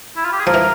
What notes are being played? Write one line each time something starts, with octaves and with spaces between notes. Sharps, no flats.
E4
F4
G4
G#4
F3 A#4
E3